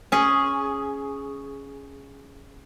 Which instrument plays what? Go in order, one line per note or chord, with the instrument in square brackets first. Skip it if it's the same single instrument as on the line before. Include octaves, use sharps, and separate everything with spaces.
[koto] C#4 G#4